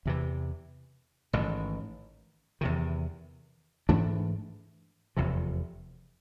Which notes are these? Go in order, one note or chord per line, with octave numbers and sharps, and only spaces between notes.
E2 C3 E3
A1 G#2 D#3
E2 C3 D#3
G#2 E3 A3 D4
F1 E2 C3 F3